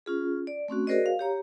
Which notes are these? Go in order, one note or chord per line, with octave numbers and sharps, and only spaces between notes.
C#4 F4 G#4
D5
A3 C4 C#4 F#4
F#4 G#4 A#4 C5 D5 D#5
F5
G4 C#5 A#5